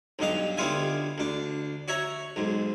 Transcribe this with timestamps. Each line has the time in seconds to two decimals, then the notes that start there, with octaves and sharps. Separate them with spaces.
0.19 B1 G2 D#4 F5
0.57 D2 G3 B3 F4 E5 G#5
1.18 D2 D4
1.88 F#4 C#5 E5 A#5
2.36 B1 G#2